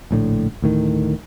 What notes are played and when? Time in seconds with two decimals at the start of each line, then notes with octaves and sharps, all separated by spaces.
0.11 A#1 A2 D3
0.62 D2 A2 D#3